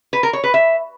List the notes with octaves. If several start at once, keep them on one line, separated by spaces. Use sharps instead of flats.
B4
A#4
C#5
B4
E5